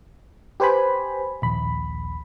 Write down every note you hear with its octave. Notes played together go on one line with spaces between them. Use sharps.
G4 B4 C5 G#5 B5
A#1 D#2 B5